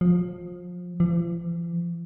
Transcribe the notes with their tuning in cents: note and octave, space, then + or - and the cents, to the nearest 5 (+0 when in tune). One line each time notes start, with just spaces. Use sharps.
F3 +25
F3 -45